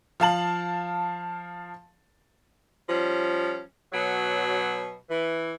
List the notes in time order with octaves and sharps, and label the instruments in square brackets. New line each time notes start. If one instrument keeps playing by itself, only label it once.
[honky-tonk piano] F3 F5 A5 F#7
[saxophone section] F3 G3 C#4
B2 F#3
E3